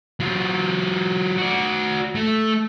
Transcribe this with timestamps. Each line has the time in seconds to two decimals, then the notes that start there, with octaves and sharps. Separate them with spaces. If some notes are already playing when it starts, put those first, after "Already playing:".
0.20 F#3 F4
1.38 F#4 D5
2.15 A3